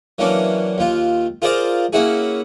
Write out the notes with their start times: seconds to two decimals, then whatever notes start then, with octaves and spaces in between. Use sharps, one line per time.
0.18 E3 F#3 A#3 C#4 D4
0.78 D#2 F4
1.42 F4 G#4 A#4 C5 D5 F5
1.93 A#3 C#4 E4 F#4 G#4